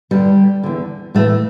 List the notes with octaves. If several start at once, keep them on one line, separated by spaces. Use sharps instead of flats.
G2 D3 G3
E2 D3
A2 E3 A3